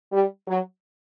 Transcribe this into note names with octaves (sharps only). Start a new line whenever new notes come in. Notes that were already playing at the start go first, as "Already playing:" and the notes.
G3
F#3